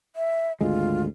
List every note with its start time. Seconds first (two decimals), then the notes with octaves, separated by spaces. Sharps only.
0.16 E5
0.61 G#1 D2 G#3 F4